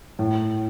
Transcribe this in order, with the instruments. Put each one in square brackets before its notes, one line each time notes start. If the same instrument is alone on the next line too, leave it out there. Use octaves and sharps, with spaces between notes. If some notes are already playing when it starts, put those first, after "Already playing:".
[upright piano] A2